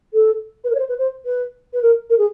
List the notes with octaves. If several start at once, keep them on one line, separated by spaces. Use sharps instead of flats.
A4
B4
A#4
C#5
C5
B4
C5
B4
B4
A#4
A#4
G#4